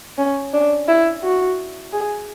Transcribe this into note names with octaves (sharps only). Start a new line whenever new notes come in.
C#4
D4
E4
F#4
G#4